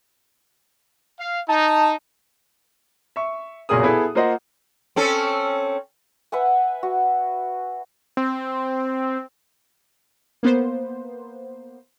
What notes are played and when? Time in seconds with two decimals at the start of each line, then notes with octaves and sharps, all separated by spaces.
1.20 F5
1.49 D#4 A5
3.16 E5 C#6
3.69 F#1 B1 A#2 G#4 A#4 D#6
3.83 B3 E4 G#4 A4
4.15 A#3 F4 C5 D#5 F#5
4.96 C4 C#4 A4
6.32 B4 E5 F#5 G#5
6.83 F#4
8.17 C4
10.43 A#3 B3 C5